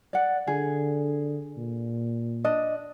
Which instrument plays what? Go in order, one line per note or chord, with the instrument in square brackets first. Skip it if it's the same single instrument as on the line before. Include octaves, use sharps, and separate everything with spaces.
[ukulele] D5 F#5
[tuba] D3 [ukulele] G#4
[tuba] A#2
[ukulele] D4 D#5